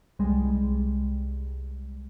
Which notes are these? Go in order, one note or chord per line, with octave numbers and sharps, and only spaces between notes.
C2 G3 G#3